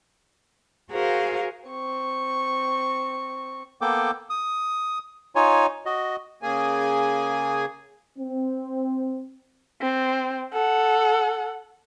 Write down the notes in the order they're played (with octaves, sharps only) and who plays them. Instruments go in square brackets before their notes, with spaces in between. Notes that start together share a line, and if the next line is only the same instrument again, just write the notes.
[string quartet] F#4 G#4 A#4 C5 F5
[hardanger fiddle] C4 C#6
[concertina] A#3 B3 A4 G5 D6
D#6
D#4 F4 C#5 G#5
F#4 D#5
[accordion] C#3 A#3 G#4 G#5
[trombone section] C4
[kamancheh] C4
A4 F#5